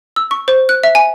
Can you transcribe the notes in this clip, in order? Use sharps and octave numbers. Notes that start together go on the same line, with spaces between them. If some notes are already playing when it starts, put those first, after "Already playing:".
E6
C#6
C5
F#6
E5
G#5